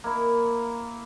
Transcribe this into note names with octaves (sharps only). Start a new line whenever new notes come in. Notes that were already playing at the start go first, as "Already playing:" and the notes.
A#3 E4